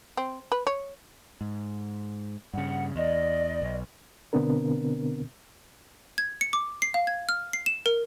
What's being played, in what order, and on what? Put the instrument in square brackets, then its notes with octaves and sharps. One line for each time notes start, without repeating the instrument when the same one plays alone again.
[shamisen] C4
B4
C#5
[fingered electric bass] G#2
[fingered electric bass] G2 C#3 [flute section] F#5
[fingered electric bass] E2 [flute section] D5 D#5
[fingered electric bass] B1
[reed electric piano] B2 D3 B3 C4 D4 A#4
[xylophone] G#6
C#7
D6
C7
F5
G#6
F6
C7
E7
A#4